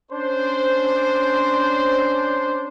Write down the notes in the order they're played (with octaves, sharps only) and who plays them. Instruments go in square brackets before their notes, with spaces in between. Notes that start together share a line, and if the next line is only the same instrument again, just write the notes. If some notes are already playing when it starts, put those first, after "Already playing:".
[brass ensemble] C#4 D4 C5